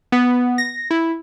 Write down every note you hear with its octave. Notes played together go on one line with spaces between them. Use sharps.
B3
A#6
E4